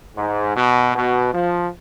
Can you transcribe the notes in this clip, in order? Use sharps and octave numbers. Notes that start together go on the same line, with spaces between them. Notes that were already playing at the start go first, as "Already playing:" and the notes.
G#2
B2
B2
F3